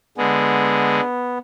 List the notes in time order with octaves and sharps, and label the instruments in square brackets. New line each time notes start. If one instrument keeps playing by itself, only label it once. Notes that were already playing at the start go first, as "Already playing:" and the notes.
[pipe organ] D3 G#3 [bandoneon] B3